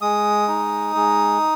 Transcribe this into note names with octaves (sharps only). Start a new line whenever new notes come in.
G#3 D#6
D#4
G#3